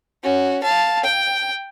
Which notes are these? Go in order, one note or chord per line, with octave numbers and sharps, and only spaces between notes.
C#4 F#4
F5 A5
G5